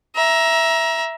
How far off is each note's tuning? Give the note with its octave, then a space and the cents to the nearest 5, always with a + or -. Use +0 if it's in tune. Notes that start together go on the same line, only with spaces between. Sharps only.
E5 +0 A#5 +20